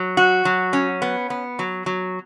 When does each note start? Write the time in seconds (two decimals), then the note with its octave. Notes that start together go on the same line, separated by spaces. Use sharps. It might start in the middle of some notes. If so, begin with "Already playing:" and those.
Already playing: F#3
0.17 F#4
0.45 F#3
0.73 C#4
1.02 B3
1.30 B3
1.59 F#3
1.86 F#3